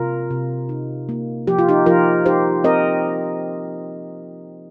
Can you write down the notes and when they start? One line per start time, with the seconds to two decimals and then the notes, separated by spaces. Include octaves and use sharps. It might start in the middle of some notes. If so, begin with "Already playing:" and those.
Already playing: C3 F4 A#4
0.31 C3
0.69 D#4
1.09 A#3
1.47 F3 G4
1.59 F4
1.69 D#4 G4
1.86 F3 F4 A#4
2.26 D#4 G4 C5
2.64 C4 A#4 D#5